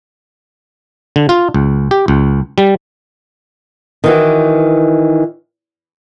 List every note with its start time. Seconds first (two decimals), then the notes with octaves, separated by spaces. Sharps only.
1.16 D3
1.29 F4
1.54 C#2
1.91 G4
2.08 C#2
2.58 G3
4.04 D#3 E3 F#4